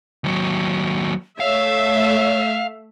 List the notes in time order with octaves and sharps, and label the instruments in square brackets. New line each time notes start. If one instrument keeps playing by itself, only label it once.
[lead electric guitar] D#2 F#3
[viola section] A3 E5 [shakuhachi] C#5 [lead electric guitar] F5